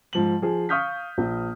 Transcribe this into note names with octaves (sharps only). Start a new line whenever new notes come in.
G#2 F3 F#7
F3 G#4
F5 C#6 D#6 F6 G6 B6
A#1